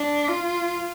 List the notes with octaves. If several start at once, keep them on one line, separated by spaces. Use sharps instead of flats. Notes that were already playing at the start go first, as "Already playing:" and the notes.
Already playing: D4
F4